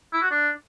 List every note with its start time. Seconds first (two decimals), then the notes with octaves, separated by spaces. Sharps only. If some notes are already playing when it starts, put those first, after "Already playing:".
0.13 E4
0.22 F#4
0.31 D4